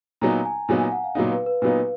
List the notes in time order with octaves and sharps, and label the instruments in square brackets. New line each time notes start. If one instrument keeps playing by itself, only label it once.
[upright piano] A#2 F#3 B3 D#4 [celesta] A#5
[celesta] G#5
[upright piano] A#2 F#3 B3 D#4 [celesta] G#5
[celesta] G#5
F#5
F5
[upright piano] A#2 F#3 B3 D#4 [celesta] F5
[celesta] B4
B4
[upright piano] A#2 F#3 B3 D#4 [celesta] B4